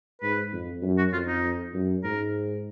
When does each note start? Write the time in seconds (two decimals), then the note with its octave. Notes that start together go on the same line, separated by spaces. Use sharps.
0.22 G#2 B4
0.52 F2
0.82 F#2
0.98 F#4
1.12 F2 F4
1.27 D#4
1.74 F#2
2.04 G#2 A#4